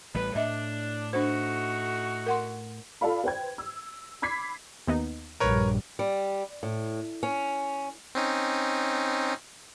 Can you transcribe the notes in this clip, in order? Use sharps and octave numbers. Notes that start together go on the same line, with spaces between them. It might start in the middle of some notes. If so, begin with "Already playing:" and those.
A1 A2 G3 B4
A2 D4 D#5 E5
A3 D4 D#4 F#4 C5
A#4 F#5 C6
F4 A4 D5 F5 B5
B4 C5 G5 G#6
E6
B5 D6 G#6 B6 C7
D#2 B3 D#4
A#1 G2 A#4 B4 C#5
G3
A2
C#4
C4 C#4 D#4